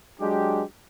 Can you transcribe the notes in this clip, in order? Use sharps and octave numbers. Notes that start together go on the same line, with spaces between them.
F#3 G#3 D4 G4